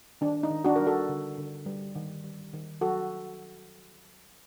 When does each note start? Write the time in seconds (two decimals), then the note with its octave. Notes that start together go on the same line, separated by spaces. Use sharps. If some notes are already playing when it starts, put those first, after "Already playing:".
0.21 D#3 D4
0.43 D#4
0.50 D#3
0.64 D4 F#4
0.76 G3 A#4
0.87 F#4 A4
1.09 D3
1.38 D3
1.66 G3
1.96 D#3
2.24 G3
2.53 D#3
2.81 F#3 F#4 A4